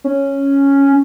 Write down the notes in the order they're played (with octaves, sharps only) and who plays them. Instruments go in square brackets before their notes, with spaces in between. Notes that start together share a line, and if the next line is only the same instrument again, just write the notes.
[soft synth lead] C#4